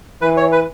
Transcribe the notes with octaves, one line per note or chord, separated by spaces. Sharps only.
E3 B4
C#5
B4